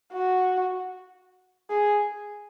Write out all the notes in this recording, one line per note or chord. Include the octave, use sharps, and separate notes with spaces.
F#4
G#4